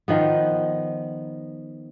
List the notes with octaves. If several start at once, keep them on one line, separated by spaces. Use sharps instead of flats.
D#3 F3 B3